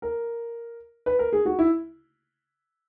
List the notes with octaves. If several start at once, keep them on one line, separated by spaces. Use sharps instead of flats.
A#4
B4
A#4
G#4
F#4
E4